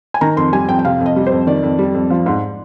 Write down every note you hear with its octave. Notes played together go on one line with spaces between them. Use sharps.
G#5
D#3 A#5
F2 C6
G3 G#5
F2 G5
G5
C3 F5
F2
D#5
G3
C5
F2
D#3 D5
F2
G3
F2
F3
G#2